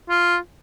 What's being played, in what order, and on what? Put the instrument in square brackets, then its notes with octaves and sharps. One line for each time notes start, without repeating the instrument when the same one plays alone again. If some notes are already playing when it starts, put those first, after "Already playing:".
[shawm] F4